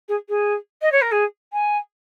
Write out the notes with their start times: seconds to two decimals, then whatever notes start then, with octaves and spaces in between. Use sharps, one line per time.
0.08 G#4
0.29 G#4
0.82 D#5
0.92 C#5
1.02 A#4
1.12 G#4
1.53 G#5